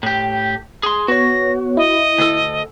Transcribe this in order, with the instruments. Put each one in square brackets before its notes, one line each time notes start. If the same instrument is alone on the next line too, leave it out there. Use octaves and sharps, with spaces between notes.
[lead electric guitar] A2 G4
G#4 C6
[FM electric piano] B3 C#5 [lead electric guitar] F#4 [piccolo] A#6
[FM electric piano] E4 [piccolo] D#5
[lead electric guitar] D2 A4